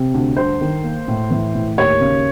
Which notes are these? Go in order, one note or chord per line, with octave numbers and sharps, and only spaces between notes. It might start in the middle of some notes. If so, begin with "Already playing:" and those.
Already playing: C3
D2
G2 C5
D#3
A#3
A2
E3
A2
D#2 C#5
C#3